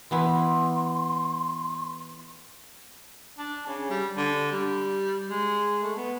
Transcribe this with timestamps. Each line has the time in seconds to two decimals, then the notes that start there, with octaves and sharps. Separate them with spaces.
0.11 E3 B3 E4 C6
3.38 D4
3.67 C#3
3.90 G3
4.17 D3
4.52 G3
5.30 G#3
5.83 A3
5.96 B3